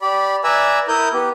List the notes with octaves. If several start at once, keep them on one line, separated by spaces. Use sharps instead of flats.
G4 D5 B5
B4 D5 E5 G#5 A#5 E6
E4 A#4 D#6 G6
B3 G4